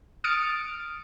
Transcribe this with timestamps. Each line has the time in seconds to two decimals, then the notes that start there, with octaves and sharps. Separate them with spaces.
0.24 D#6 F6 A6 C#7 D7